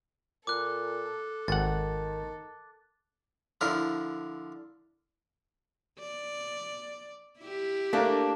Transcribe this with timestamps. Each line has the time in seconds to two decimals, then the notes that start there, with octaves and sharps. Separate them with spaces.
0.47 A#2 A4 D6 F#6
1.48 G#1 D#3 F#5 A6
3.61 D3 F3 E4 A#4
6.00 D5
7.40 E4 G4
7.93 A3 A#3 D4 A#4